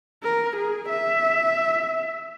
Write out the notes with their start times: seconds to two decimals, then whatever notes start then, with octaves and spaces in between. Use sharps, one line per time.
0.23 A#4
0.56 G#4
0.89 E5